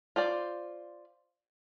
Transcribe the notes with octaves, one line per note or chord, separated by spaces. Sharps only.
F4 C5 D5